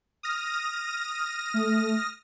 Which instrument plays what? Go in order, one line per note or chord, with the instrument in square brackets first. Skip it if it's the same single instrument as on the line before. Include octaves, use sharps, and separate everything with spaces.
[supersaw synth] D#6 F6 A#6
[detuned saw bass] A3